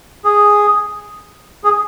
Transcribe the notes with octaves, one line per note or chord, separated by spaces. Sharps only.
G#4
G#4